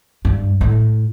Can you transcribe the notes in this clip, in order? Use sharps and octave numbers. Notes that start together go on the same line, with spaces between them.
G2
A2